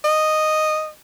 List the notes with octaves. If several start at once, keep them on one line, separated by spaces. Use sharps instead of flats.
D#5